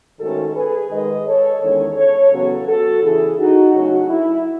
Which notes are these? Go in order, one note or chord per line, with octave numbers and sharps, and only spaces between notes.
G#2 D#3 A3 C#4 F#4 A4
G#4 B4
G#2 D#3 G#3 B4 D#5
A4 C#5
E2 D#3 G#3 C#4 A4 C#5
A4 C#5
E2 C#3 F#3 B3 F#4 A4
F#4 A4
E2 C#3 E3 E4 G#4
D#4 F#4
C#3 F#3 A3 C#4 D#4 F#4
E4